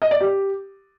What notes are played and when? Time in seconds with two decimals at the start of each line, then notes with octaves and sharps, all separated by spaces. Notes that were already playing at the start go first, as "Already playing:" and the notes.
0.02 D#5
0.11 D5
0.21 G4